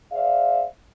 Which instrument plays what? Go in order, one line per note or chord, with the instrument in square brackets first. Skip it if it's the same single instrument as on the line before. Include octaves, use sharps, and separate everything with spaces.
[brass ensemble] G#4 C5 D5 E5 F5